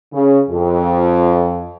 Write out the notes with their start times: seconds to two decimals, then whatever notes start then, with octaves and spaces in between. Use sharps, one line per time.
0.13 C#3
0.50 F2